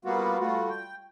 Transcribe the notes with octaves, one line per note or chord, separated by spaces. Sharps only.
G3 A#3 B3 F4 F#4
G3 A3 F4 F#4
G5